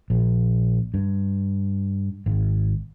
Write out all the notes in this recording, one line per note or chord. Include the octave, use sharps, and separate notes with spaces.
A#1
G2
G#1